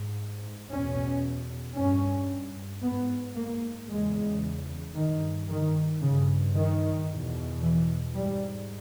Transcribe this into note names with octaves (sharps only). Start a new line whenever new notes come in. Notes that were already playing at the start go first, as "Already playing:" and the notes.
Already playing: G#2
E2 B2 C#4
G2 C#4
G#2 B3
A#3
E2 C#3 G#3
G2 D#3
D#3
G2 C#3
D#3
E2 B2
E3
G#2 G3